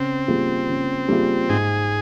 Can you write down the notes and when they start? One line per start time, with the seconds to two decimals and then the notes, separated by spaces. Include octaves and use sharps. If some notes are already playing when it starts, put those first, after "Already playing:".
Already playing: C#3 C4
0.28 G3 A#3 F4 G#4
0.69 C#3
1.09 G3 A#3 F4 G#4
1.49 G#2 G#4